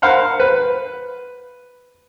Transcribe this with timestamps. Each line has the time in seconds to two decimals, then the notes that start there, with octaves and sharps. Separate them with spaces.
0.02 A#4 C5 F5 F#5 B5
0.40 B4